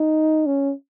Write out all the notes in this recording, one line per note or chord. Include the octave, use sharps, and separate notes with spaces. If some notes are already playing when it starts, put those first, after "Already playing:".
Already playing: D#4
C#4